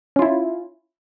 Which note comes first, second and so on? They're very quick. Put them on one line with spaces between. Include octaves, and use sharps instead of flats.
C#4 F4 E4